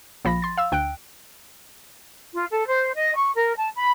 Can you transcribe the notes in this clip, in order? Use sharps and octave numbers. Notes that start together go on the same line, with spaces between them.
A#1 F3 B5 A#6
C6 A6
F5 E6
D2 G5 F#6 D7
F4
A4
C5
D#5
C#6
A#4
A5
B5